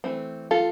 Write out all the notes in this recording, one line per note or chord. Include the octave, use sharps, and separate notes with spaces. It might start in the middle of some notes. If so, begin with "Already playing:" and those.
E3 A3 C4
F4 A4